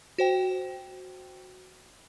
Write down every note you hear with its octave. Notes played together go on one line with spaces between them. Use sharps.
F#4 C5 G5